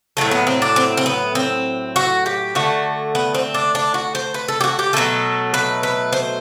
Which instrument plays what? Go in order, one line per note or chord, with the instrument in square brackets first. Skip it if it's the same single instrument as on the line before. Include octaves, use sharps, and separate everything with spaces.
[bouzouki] A2 F#3 A3
B3
C4
D4
C4
C4
B3
C4
F#4
G4
D3 A3 F#4
B3
C4
D4
D4
F#4
C5
B4
A4
G4
F#4
G4
B2 F#3 A3 A4
B4
B4
C5